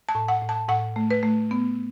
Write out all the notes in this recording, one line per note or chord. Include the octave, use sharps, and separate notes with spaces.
A5
A2
F#5
A2
A5
A2 F#5
A3
B4
A3
B3